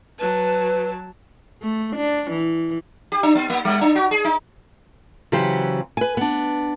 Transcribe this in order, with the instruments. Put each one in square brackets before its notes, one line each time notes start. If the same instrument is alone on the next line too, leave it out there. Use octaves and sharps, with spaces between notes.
[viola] F#3 A5 [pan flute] B4
[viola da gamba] A3
D4
E3
[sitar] G4
D4
B3
A#3
G3
D4
F#4
G#4
D#4
[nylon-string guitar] C#3 E3 F#3 G4 C5
B4 G#5
B3 D4